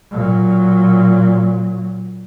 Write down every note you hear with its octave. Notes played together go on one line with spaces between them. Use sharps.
A#2 F#3